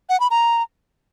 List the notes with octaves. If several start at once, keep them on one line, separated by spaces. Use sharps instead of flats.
F#5
B5
A#5